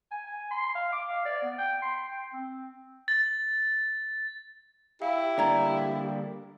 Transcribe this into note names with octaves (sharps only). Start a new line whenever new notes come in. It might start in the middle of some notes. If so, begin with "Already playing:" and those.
G#5
G#5
C6
F5
D6
F5
D5
B3
G5
C6
G5
C4
A6
E4 G4 F5
D3 G3 A#3 D5 A#5 G#6